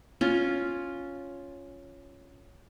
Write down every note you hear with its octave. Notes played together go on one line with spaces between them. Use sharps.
C#4 F4